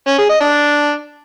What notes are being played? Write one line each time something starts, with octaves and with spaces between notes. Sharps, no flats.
C#4
G#4
D#5
D4